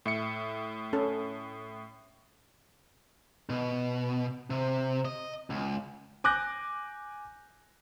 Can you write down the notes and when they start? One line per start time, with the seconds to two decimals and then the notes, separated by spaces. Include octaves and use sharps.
0.06 A2 E5 C#7
0.93 C#4 A4
3.50 B2
4.50 C3
5.05 D#5
5.50 C#2
6.24 G#5 D6 F#6 G6 A#6